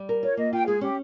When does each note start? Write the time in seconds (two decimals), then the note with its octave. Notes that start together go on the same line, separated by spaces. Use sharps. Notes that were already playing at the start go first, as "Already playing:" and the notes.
Already playing: G3
0.09 A#4
0.23 F4 C#5
0.37 A#3 D#5
0.52 F4 G5
0.67 G#3 G#4
0.81 C#4 G4